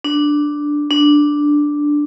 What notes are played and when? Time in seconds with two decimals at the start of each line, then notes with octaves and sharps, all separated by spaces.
0.04 D4
0.91 D4